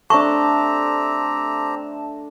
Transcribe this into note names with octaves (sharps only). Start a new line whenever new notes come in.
A3 C4 D4 G4 A5 A#5 C#6